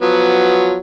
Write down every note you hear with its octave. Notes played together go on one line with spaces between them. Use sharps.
F3 F#3 B3